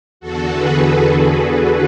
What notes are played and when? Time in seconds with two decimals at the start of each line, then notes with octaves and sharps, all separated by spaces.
0.20 E2 D3 F#4 A4
0.52 G#4 B4